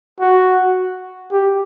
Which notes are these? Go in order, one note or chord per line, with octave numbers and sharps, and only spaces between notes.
F#4
G4